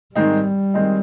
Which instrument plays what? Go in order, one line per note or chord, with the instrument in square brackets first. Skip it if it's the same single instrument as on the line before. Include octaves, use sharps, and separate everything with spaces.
[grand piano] G#2 D#3 G#3 C4 D#4 [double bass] G3
[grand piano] D#3 G#3 C4 D#4